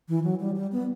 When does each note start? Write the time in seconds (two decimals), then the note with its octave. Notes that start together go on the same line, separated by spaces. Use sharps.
0.09 E3
0.24 F#3
0.40 G3
0.55 G3
0.72 B3